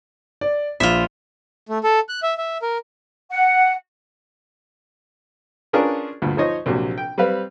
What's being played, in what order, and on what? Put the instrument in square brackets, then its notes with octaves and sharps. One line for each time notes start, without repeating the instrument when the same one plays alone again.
[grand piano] D5
[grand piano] A#1 [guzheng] F4 E5
[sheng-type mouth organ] A3
A4
F#6
E5
E5
A#4
[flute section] F#5
[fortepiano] C#4 D4 F4 G#4 A#4 B4
D2 G2 A#2
F3 D#4 C5 C#5 D#5
A#1 C3 F#3
G5
G3 C4 B4 F5